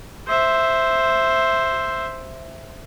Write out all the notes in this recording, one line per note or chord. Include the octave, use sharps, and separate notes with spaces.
C5 E5